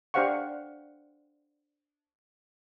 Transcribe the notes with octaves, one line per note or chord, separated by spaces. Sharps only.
D4 G4 C5 F5 F#5 C#6